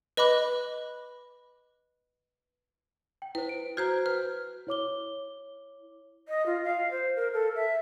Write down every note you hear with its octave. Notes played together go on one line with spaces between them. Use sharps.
B4 D#5 B5 D6 F#6
G5
E4 B4 C5
D7
F#4 C5 A#5 F6 G6 G#6
B4 F6
E4 C#5 D6 G7
D#5
F4
F5
C5
A#4
A4
E5